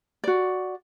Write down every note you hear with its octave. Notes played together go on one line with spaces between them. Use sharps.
F#4 D5